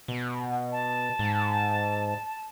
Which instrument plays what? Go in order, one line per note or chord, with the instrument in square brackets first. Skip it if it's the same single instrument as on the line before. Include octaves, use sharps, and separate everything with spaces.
[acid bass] B2
[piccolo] A5
[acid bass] G#2